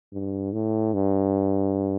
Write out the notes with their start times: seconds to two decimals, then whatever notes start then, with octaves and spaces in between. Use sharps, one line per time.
0.13 G2
0.53 A2
0.94 G2